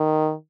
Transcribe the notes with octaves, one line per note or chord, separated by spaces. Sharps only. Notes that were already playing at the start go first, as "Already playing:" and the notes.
Already playing: D#3